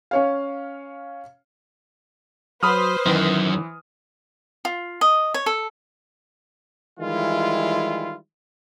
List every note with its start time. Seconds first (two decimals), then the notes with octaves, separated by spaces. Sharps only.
0.11 C#4 C#5 F5
2.63 F#3 B4 C5 B5 D#6 F6
3.06 F#2 D#3 E3
4.65 F4
5.01 D#5
5.34 C#5
5.46 A4
7.00 D#3 E3 G3 G#3 E4 F4